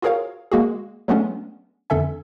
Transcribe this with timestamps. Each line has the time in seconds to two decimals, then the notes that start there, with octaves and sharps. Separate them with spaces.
0.02 F4 F#4 G#4 A#4 C#5 F5
0.52 G#3 A#3 F#4 G#4
1.08 F#3 G#3 A3 B3 C#4 D4
1.90 F2 D3 A4 E5 G#5